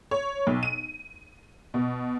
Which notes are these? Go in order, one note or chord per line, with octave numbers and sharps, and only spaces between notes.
C#5
B1
D#7
B2